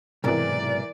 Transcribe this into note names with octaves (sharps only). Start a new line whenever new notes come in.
B1 G#2 C3 E3 A#4 D5